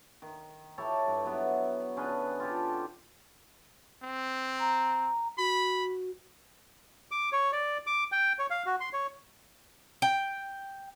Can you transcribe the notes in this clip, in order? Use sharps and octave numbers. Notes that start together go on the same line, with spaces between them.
D#3
E4 G4 A4 C#5
G2
F#3 B3 E4
D3 C#4 G#4 B4
F4 G4 A4
C4
A#5
F#4 B5
D6
C#5
D5
D6
G5
C#5
F5
F#4
C6
C#5
G5